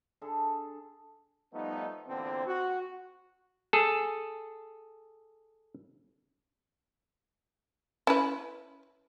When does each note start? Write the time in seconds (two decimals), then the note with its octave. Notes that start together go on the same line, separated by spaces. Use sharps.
0.22 D3 G#4 A4
1.53 F3 G3 A3 B3 D#4
2.08 E2 A#2 D3 C4
2.46 F#4
3.73 G#4 A4
8.07 C#4 E4 B4